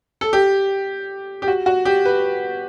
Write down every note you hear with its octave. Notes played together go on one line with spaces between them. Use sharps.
A4
G4
G4
F#4
F#4
G4
B4